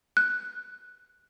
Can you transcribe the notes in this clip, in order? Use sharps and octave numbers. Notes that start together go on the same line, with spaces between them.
F#6